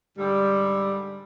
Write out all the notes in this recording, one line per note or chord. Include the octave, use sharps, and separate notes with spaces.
G#2 D3 G3